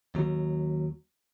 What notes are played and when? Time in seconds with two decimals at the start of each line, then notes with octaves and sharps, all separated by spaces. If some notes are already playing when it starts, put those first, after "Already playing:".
0.15 D#2 F#3